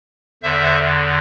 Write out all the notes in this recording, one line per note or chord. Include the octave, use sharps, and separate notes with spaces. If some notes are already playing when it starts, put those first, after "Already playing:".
E2 D3 C5 E5